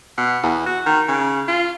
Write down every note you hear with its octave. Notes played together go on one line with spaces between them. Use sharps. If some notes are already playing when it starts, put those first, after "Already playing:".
B2
E2
F#4
D#3
C#3
F4